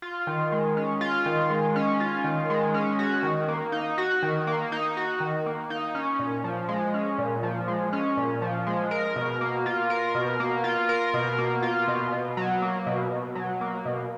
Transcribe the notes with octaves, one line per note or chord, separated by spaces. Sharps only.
F4
D#3
G#3
C#4
F4
D#3
G#3
C#4
F4
D#3
G#3
C#4
F#4
D#3
A#3
D#4
F#4
D#3
A#3
D#4
F#4
D#3
A#3
D#4
C#4
A#2
F3
G#3
C#4
A#2
F3
G#3
C#4
A#2
F3
G#3
A#4
B2
A#3
F4
A#4
B2
A#3
F4
A#4
B2
A#3
F4
B2
B2
F#3
A#3
B2
B2
F#3
A#3
B2